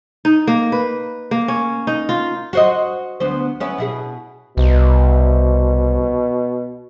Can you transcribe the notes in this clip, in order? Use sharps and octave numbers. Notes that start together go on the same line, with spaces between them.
D#4
A#3
B4
A#3
C#4
D#4
F4
F#4 C5 D#5
D2 B3 C5
B3 C#4 E4
B2 E4 G#4
C2 B2